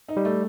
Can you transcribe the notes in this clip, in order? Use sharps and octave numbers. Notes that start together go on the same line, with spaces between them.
D#4
G3
A3